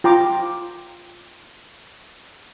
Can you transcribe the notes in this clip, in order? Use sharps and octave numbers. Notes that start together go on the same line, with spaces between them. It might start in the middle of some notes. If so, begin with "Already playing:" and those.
F4 G5 A#5 D6